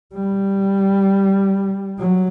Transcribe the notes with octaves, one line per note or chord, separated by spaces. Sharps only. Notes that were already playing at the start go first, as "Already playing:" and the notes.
G3
F#3